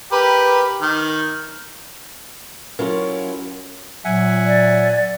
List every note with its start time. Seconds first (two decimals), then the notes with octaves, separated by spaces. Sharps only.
0.12 G4 A#4 B4
0.81 D#3
2.79 F#3 C#4 E4 F4 A#4
4.05 A#2 F#3 E5 F#5 G#5
4.46 D5